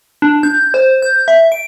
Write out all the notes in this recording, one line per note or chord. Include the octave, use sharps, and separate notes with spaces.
D4
G6
C5
G6
E5
D7